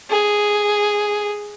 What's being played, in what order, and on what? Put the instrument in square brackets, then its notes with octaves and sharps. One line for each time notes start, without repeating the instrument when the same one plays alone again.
[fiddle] G#4